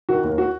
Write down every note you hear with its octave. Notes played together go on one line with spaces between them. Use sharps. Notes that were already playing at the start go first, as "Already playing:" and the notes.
D#3 F#4
D#2
F#4